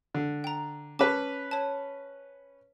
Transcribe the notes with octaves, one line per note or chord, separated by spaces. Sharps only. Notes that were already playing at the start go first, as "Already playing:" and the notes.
D3
G5 A#5
C#4 B4 A5 D6
C#5 A5